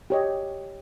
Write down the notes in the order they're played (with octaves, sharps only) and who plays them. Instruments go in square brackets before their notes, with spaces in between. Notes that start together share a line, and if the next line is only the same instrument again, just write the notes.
[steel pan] G4 C#5 D#5